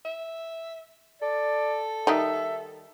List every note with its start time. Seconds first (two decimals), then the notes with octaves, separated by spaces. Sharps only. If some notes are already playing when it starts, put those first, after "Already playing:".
0.05 E5
1.22 A4 D5
2.07 D#3 G3 D#4 E5